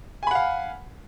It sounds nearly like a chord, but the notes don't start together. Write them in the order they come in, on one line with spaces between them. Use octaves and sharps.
G#5 B5 F#5 F5